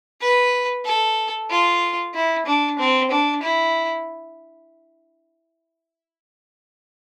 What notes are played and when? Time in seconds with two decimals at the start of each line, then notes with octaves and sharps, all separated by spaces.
0.21 B4
0.85 A4
1.50 F4
2.14 E4
2.46 D4
2.79 C4
3.11 D4
3.43 E4